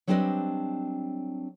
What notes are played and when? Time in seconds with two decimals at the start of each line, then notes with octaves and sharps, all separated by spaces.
0.07 F#3 G3 C4 D4 B4 D#5